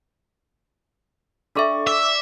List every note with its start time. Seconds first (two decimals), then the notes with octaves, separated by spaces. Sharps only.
1.55 D4 A4 D5 E5 C#6
1.87 E5 D6